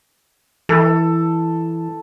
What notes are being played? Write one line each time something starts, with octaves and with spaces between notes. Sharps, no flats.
E3 A4